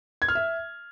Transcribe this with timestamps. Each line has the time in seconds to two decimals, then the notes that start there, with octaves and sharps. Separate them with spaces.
0.22 G#6
0.28 F6
0.35 E5